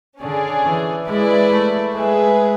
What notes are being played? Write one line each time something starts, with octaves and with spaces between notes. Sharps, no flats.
D3 C#4 G#4 D5
E3
G#3 E4 B4 D5
A3
G#3 G#4 B4 E5